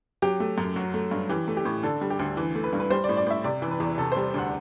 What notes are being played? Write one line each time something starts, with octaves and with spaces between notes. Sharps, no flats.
F#3 G4
A3
F#2
F#3 F#4
A3
G2
E3 G4
A3
G4
A2
D3 A4
G3
G4
D2
E3
A3
B4
G2
B4
G3 C5
D5
A2
D5
A2 E5
C3 D5
E3
B4
E2
C3 A4
G3 C5
D2 F#5